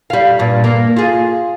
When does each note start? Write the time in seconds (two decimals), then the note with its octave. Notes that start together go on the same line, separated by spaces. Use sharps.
0.10 G3 F5
0.39 G2 A#2
0.64 A#3
0.96 F4 G#4